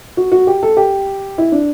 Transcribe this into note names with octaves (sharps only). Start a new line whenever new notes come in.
F#4
F#4
G4
A4
G4
E4
D4